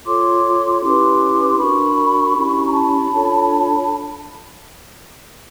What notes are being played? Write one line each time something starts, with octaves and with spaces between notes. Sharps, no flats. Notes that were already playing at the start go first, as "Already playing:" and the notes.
F4 A4 C#5 C6 D6
C#4 E4 G4 B4 C6 D6
C6
D4 F#4 A#4 B5 C#6
C#4 E4 G4
A#5
A5 B5
D4 F4 A4 C#5